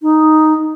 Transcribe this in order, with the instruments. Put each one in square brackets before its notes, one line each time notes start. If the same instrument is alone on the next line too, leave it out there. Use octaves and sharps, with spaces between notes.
[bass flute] D#4